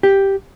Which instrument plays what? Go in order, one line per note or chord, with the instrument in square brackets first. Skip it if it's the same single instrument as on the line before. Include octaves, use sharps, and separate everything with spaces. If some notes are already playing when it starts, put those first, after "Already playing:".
[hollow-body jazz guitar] G4